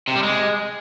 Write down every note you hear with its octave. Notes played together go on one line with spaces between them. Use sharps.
C3
G3
G#3